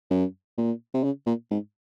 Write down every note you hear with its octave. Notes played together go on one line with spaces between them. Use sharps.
F#2
A#2
C3
C#3
A#2
G#2